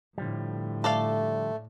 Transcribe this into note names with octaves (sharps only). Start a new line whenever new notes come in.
A2 D3 F3 G3
A3 A4 D5 F5